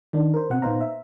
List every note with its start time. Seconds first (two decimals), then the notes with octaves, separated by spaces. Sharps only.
0.13 D#3 D4
0.34 A#4 C5
0.50 B2 C4 F#5
0.62 A#2 B3 D#4 C5 F5 A#5
0.81 E5